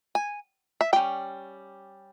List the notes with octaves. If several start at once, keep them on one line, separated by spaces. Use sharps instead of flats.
G#5
E5
G3 C#4 G5